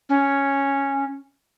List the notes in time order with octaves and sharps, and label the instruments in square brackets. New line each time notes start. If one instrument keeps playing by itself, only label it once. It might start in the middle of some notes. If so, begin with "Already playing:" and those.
[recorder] C#4